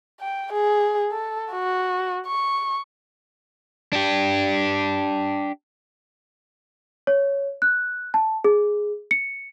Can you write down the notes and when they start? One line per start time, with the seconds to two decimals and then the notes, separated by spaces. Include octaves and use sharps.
0.21 G5
0.53 G#4
1.12 A4
1.53 F#4
2.27 C#6
3.93 D4 G4
7.07 C#5
7.62 F#6
8.14 A5
8.44 G#4
9.11 C#7